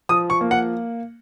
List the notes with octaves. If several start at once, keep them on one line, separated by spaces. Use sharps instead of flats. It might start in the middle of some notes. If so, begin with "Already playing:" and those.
F3 D#6
C#6
A#3
F#5